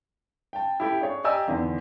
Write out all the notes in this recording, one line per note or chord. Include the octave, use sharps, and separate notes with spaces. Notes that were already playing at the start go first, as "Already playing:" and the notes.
G5 A5
E4 G4 A4 B5
D4 G#4 C#5
G4 D5 D#5 G#5 A#5 E6
E2 D3 D#3